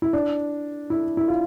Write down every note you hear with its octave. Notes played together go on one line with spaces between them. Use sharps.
E4
D4
E4
E4
F4